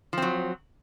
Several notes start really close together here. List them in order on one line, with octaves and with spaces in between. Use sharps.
F3 C4 F#3